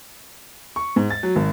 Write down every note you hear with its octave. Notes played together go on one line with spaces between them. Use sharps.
C#6
G#2
A6
F#3
G#1